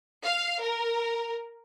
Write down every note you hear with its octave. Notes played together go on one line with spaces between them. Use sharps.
F5
A#4